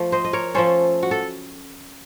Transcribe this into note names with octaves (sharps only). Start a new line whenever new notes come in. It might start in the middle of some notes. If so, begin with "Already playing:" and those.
Already playing: F3 A3
C5 D#5
D#5
A#4 C#5
F3 A3 C#4 A4 C5
F#4
A4